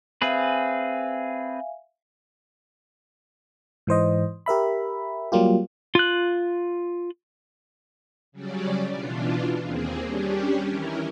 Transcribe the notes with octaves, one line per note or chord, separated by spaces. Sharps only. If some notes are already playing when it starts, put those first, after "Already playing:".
C4 G#4 B4 E5 F5 G#5
G#2 E3 C5 D#5
G4 A#4 E5 B5
F#3 G3 A#3 F4 G4
F4 F#6
C#3 F#3 G3 C#4 D5
B2 E3 D4 F4
D#2 A#3 C4 G#4
G3 C#4 D4 G4
D#3 E3 C#4 E4 A#4